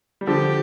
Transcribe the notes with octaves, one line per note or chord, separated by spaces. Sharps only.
G3
D3 F3 G4